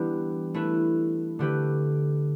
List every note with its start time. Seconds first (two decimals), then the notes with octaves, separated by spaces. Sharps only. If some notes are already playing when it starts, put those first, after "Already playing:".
Already playing: E3 G3 B3 D4 G4
0.54 A3 E4 B4
1.39 D3 A3 G4 B4